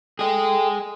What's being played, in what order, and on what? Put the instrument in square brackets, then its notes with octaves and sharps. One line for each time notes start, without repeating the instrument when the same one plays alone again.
[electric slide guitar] G#4 D#5 [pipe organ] A4 G5